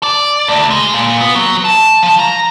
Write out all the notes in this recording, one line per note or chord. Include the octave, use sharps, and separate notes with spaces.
D5
D2
G#3
A#2
B3
F#3
A5
F3
A#5